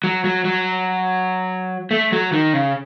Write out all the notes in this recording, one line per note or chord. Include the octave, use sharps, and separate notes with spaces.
F#3
F#3
F#3
A3
F#3
D#3
C#3